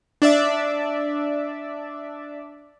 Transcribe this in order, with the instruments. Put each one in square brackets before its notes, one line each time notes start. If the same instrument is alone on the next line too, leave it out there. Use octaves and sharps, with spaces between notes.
[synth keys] D4 D5 E5